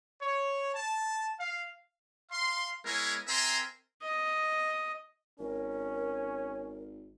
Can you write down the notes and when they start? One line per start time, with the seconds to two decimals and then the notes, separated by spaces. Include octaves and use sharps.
0.20 C#5
0.74 A5
1.37 F5
2.32 F5 C6
2.86 G#3 B3 E4 A#4 C#5 G#5
3.28 C4 A#4 E5 G#5 A#5 C6
4.03 D#5
5.39 G#1 C#4 A#4